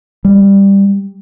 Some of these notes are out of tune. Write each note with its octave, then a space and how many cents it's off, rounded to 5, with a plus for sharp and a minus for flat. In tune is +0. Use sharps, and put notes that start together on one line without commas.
G3 +10